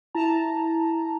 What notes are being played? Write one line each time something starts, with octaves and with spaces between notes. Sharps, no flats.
E4 A5 A#5